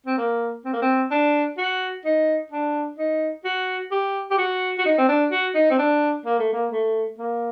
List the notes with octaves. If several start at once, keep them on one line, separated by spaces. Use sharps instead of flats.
C4
A#3
C4
A#3
C4
D4
F#4
D#4
D4
D#4
F#4
G4
G4
F#4
F#4
D#4
C4
D4
F#4
D#4
C4
D4
A#3
A3
A#3
A3
A#3